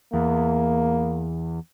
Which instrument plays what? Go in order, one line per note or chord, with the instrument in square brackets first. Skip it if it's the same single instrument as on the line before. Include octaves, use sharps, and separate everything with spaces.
[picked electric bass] E2 [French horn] A#3